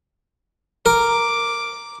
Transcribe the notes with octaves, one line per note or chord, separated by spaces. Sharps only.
A#4 D6